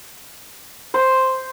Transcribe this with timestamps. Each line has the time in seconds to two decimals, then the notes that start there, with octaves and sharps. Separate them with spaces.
0.94 C5